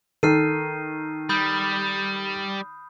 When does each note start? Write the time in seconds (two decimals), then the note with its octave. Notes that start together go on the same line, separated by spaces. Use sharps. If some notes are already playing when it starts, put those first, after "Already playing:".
0.23 D#3 A4 F6 C7 D#7
1.29 G3 B5 D#6 G6